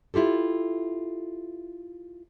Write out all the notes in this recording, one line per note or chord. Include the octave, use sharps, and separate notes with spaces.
E4 F4 G4 A4